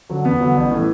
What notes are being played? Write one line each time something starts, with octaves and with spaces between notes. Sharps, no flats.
D3 F#3
E2 B3
D3 F#3
A1
A2
E3